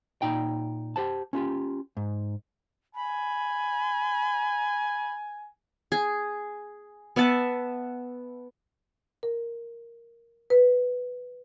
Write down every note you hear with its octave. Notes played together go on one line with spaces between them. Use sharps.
A#2 D#4 G5
G4 C5 A5
C#4 F4 G4
G#2
G#5 B5
G#4
B3 E5 F#5 A5
A#4
B4